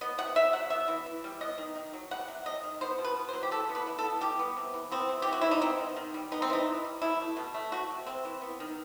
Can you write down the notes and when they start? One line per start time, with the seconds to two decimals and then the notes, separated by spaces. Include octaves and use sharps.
0.01 B3 D#5
0.18 C3 F#5
0.35 C3 E5
0.53 F#3 F#5
0.70 B3 E5
0.88 E3
1.06 E3
1.24 G3
1.40 B3 D#5
1.58 D#3
1.75 D#3
1.93 F#3
2.11 G3 F#5
2.28 C3
2.46 C3 D#5
2.64 D#3
2.81 B3 C5
2.98 B2
3.04 B4
3.16 B2
3.29 C5
3.33 F#3
3.43 G4
3.51 E3 A4
3.69 B3
3.75 B4
3.87 E3
3.99 A4
4.04 B3
4.21 G3 G4
4.39 B3
4.57 C3
4.74 E3
4.92 B3 C4
5.09 C3
5.22 G4
5.27 C3
5.33 F#4
5.41 E3 E4
5.51 D#4
5.61 B3 C4
5.80 D#3
5.97 D#3
6.14 G3
6.32 B3 D#4
6.42 C4
6.50 E3 D#4
6.66 E3
6.84 G3
7.01 B2 E4
7.20 A3
7.37 B2
7.54 A3
7.72 A3 F#4
7.90 C3
8.06 C3 C4
8.25 E3
8.42 B3
8.60 D#3